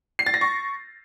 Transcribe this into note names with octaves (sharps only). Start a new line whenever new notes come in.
C7
A6
A#6
C#6